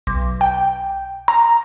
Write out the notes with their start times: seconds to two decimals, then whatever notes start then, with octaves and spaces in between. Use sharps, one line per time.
0.07 B1
0.41 G5
1.28 A#5